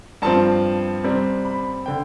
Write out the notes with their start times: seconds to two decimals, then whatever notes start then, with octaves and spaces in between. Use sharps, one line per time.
0.22 G2 F3 C4 A5
1.04 C3 G3 C4
1.45 B5
1.86 D3 G5